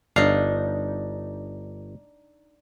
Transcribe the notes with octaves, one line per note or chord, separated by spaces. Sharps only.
G1 D4 D#4 F5